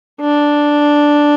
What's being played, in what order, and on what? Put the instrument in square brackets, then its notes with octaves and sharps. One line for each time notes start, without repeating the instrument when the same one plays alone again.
[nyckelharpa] D4